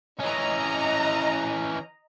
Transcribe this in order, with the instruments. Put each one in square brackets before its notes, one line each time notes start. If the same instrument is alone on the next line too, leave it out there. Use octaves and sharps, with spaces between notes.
[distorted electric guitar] E3 C#4 [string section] D#5 A#5